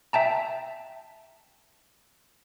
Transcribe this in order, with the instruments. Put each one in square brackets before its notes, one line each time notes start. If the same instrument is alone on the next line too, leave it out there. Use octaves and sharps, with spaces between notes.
[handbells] E5 G5 A5 A#5